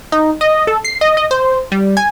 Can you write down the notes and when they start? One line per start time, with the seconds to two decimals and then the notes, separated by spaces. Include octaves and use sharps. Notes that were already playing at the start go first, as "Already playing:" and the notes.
0.12 D#4
0.41 D#5
0.67 A4
0.84 C7
1.01 D#5
1.17 D#5
1.31 C5
1.72 G3
1.97 G#5